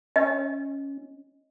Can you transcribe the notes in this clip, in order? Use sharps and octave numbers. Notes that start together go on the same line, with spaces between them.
C#4 D#5